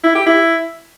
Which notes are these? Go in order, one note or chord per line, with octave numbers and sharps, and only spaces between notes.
E4
G4
E4